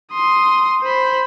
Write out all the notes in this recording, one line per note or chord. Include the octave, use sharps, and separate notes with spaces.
C6 D#6
C5 B5